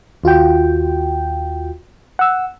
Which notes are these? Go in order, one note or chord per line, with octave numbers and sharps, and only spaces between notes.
D#2 F4 F#4 G5
F#5 E6